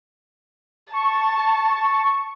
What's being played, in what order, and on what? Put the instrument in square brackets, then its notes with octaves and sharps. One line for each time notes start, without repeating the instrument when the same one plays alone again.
[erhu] A5 [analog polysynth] C#6